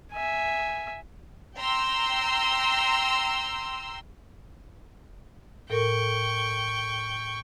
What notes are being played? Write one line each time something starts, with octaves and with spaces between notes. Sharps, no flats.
E5 G#5
G5 A#5 C6 E6
A2 A4 A#4 G5 C#6